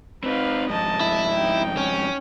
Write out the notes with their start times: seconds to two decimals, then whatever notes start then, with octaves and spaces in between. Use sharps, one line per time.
0.24 C4 D#4 B4 F5
0.69 F2 G#2 D#5 A5
1.01 E4
1.34 D#4 G5
1.77 C#4